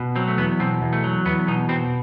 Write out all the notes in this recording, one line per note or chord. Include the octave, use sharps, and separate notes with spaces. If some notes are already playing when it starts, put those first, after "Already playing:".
Already playing: B2
F#3 C4
A3
E2 B3
B2 C4
E2
A3
F#3
E2 B3
B2 D#4
B2 C4